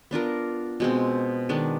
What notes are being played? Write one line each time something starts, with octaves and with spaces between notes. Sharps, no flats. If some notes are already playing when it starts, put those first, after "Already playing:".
B3 D4 F4 A#4
B2 G#3 C4
D#3 G#3 B3 D4